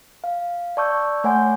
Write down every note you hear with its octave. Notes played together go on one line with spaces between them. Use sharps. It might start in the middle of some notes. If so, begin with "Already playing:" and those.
F5
D5 A5 C#6 E6 G6
A3 C#5 F#5 G#5 C6 G6